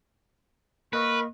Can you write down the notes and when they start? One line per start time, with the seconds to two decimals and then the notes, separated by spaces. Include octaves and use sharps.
0.93 A#3 A#4 B4 D#5 C#6